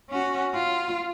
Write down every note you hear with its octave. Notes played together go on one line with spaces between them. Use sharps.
C#4 F#4
F4